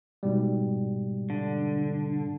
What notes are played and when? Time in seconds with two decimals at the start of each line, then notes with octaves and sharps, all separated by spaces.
0.23 G#2 B2 G3
1.30 D3